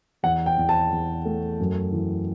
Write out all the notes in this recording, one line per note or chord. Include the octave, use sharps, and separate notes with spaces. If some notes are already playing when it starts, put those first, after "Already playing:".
E2 F#5
G5
E2
A5
E2
A3
F#2
E3